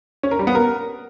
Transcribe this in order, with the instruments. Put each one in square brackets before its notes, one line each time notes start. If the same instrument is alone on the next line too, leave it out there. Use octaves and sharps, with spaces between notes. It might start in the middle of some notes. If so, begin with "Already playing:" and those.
[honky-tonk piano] C#4
A#4
G3
B3
A#4